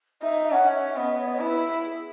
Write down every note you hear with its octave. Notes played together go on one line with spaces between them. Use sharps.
D#4 E5
C#4 F#5
E5
B3 D#5
C#5
D#5
C#5
E4 B4
G#4